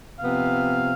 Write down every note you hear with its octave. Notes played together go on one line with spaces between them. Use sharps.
C3 F3 B3 F5